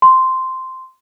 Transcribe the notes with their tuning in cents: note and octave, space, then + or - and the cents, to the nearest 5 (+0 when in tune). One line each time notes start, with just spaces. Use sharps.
C6 -5